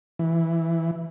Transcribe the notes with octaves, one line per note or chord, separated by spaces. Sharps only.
E3